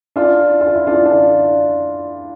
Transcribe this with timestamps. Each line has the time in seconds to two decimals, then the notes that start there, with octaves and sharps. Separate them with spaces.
0.16 D4 F4
0.61 F4
0.74 E4
0.87 D4 F4
1.05 D4 F4